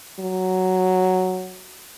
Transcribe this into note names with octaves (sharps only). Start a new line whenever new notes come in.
F#3